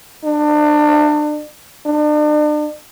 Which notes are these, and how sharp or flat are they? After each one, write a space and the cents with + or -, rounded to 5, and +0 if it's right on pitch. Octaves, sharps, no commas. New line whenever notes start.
D4 +30
D4 +40